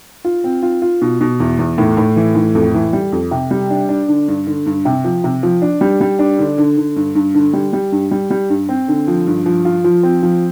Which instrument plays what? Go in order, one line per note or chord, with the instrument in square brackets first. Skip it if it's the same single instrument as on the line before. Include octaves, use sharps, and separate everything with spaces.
[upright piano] F4
C4
F4
F4
B2
B2
E2
E2
A2
A2
E3
A2
F2
E3
G3
F2
C3
G3
D4
D4
D3
G2
D3
G2
C3
F3
C3
F3
D4
G3
G3
D4
D3
D3
D3
G2
G2
D3
G3
G3
G2
G3
G3
G2
C4
D3
F3
G2
F3
F4
F3
C4
F3